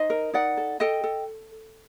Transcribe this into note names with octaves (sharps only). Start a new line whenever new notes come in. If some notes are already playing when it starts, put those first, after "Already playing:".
Already playing: D#4 C5 D#5
A#4
D#4 D5 F#5
A4
A4 D#5 G5
A4